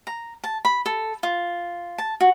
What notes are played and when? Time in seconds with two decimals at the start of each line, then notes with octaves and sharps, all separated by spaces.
0.07 A#5
0.44 A5
0.65 B5
0.86 A4
1.23 F4
1.98 A5
2.21 F#4